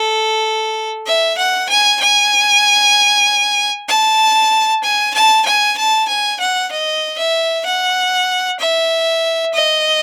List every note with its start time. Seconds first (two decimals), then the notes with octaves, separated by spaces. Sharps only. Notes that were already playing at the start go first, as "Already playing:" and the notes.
Already playing: A4
1.07 E5
1.38 F#5
1.69 G#5
2.01 G#5
3.88 A5
4.83 G#5
5.14 A5
5.45 G#5
5.78 A5
6.08 G#5
6.40 F#5
6.72 D#5
7.18 E5
7.66 F#5
8.60 E5
9.54 D#5